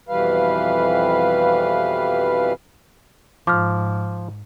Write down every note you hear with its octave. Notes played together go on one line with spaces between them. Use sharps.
F2 B2 E3 G3 B4 F5
G#2 F3 D6 F6